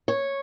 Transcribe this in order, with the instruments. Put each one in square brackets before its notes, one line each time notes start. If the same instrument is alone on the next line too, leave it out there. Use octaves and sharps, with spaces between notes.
[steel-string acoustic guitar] C#5